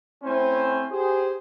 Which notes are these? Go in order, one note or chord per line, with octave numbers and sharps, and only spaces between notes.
A3 C4 C#4 E4 C5 G#5
G4 G#4 C5